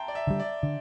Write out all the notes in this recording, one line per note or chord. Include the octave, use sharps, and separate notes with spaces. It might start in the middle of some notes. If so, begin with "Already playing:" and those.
Already playing: E5 G5 A5 A#5 C6
D5
E5
D3 G3
D5
D3